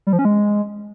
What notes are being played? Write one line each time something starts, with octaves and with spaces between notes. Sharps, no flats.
G3
F3
C#4
G#3